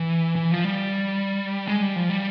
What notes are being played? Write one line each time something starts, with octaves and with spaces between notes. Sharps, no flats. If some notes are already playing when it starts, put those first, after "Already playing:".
Already playing: E3
E3
F3
G3
G#3
G3
F3
G3